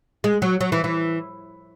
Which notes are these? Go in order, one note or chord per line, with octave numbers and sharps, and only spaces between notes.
G#3
F#3
F#3
E3
E3